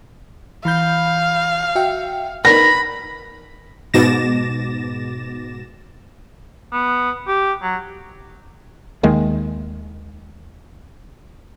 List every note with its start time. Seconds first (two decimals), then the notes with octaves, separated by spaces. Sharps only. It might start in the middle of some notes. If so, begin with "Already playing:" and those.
0.65 E3 F5 B5 G6
1.75 F#4 E5 G5
2.45 D#4 A#4 B4 B5 A#6
3.94 G#2 B2 D6 A6 A#6 E7
6.73 B3
7.27 G4
7.63 F#3
9.03 D#2 D#3 G#3 A#3